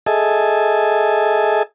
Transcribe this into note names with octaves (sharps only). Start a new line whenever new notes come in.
G#4 A4 D#5 E5 G#5 A5